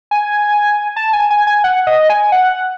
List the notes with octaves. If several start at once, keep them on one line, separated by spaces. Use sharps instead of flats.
G#5
A5
G#5
G#5
G#5
F#5
D#5
G#5
F#5